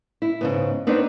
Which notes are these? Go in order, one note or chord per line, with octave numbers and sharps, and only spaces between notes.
E4
G#2 C#3 B3
B3 C4 D4 D#4 B4 C#5